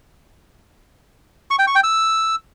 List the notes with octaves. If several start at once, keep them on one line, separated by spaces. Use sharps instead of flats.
C#6
G5
C#6
G5
E6